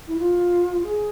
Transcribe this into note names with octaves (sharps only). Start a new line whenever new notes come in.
E4
F4
G#4